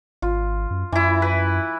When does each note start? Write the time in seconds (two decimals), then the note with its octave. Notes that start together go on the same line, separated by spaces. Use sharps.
0.22 G#1 F4
0.71 F#2
0.92 F#2 E3 E4
1.22 B4